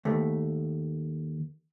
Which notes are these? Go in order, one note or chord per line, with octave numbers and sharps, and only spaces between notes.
D#2 A3